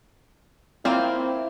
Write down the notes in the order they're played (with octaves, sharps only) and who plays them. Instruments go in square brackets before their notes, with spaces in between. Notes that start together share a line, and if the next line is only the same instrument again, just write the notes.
[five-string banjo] A#3 F4 [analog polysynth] C4 [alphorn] E4